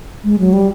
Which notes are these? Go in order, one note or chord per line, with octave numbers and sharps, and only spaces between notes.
G#3
F#3
G3